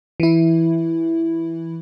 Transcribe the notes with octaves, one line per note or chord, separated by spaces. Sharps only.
E3 E4